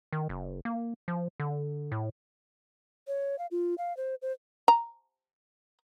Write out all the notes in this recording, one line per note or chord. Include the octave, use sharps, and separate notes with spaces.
D#3
F#1
A#3
F3
D3
A2
C#5
F5
F4
F5
C5
C5
A#5